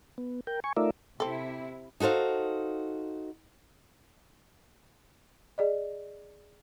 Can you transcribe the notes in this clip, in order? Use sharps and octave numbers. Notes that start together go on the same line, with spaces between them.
B3
A#4 G5
G#5 C#6
A3 D#4 F4 A#4 D5 E5
C3 C4 E4 A4
D#4 F#4 A4 C5 F5
G#4 D5 D#5